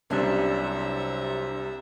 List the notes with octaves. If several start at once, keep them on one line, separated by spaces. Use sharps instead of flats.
C2 C3 F#3 C#4 D4 E5 A#5